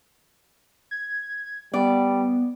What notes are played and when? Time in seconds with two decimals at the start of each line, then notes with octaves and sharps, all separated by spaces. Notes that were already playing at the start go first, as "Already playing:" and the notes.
0.91 G#6
1.74 G3 B3 D5